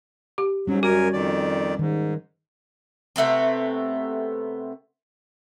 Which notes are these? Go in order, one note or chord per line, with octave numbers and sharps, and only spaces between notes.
G4
G#2 F#3 G3 C#4
F#2 F#4 A#4 G#5
F2 D#3 D5
G#2 D#3
C3 A3 B3 C4